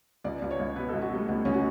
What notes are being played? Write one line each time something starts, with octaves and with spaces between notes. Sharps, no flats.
C#2 D5
C#2
C#5
C#2
B2 B4
A4
C#2
F#4
G3 A3
C#2 B3
C#2 C#4
F#4